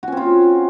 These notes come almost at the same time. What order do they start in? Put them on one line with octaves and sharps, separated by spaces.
F#4 C#4 C4 F4